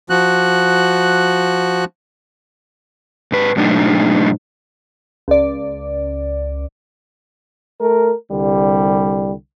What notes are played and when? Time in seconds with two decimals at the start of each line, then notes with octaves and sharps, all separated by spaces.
0.10 F3 F#4 F#6
3.32 G#2 B4
3.57 G#2 B2 F#3 A3 D4 D#4
5.28 C#2 D5
7.81 A3 A#4
8.31 C2 D3 G3